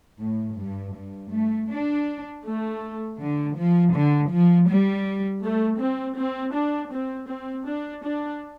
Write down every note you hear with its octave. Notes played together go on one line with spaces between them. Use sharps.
A2
G2
G2
A3
D4
A3
D3
F3
D3
F3
G3
A3
C4
C4
D4
C4
C4
D4
D4